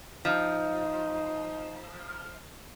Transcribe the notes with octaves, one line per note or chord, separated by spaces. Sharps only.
F3 D#4